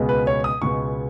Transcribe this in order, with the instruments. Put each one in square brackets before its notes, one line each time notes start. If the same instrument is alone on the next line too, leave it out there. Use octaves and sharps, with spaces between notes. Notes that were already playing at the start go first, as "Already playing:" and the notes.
Already playing: [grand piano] C#2 B2 G#3 B3
B4
C#5
D#6
C#2 B2 G#3 B3 C#6